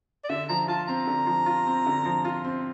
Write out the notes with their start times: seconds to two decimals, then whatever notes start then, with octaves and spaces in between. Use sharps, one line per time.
0.24 D5
0.29 D3 E5
0.49 F3 A#5
0.68 F4 A5
0.88 C4 A#5
1.07 D3
1.27 F3
1.46 F4
1.67 C4
1.86 D3
2.06 F3
2.25 F4
2.45 C4